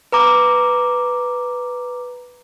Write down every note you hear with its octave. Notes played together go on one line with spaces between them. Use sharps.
B4 A#5 D6